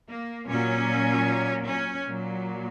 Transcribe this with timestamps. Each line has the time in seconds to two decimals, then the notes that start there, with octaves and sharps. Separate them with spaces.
0.09 A#3
0.48 A#2 F#3 C#4
1.65 C#4
2.04 A#2 F#3